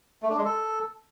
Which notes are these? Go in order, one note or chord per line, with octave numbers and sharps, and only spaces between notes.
A3
D4
G#3
A4